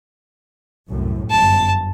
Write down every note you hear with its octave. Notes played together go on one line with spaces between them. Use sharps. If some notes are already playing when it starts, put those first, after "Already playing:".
C2 F#2 A2
G1 F#2 A5